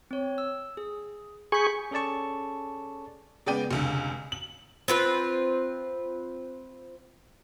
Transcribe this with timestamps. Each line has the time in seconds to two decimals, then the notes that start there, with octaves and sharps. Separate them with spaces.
0.11 C4 C#5
0.38 E6
0.77 G#4
1.52 G#4 B5 C#6 G6 B6
1.91 C#4 G#4 A4 D5 A5 C#6
3.46 C#3 G#3 B3 D5 G5 D#7
3.71 F1 C#2 D3
4.32 F#7
4.88 C4 F4 B4